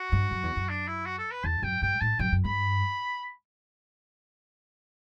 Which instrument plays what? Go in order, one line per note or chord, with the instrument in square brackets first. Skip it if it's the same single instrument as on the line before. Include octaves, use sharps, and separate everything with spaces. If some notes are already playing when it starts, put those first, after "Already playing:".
Already playing: [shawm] F#4
[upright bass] G2
F#2
E2
F#2
[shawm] D4
E4
F#4
A4
B4
[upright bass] E2 [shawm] A5
[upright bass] F#2 [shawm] G5
[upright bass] G2 [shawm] G5
[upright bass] A2 [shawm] A5
[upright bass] F#2 [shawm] G5
[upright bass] F#2
[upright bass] G2 [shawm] B5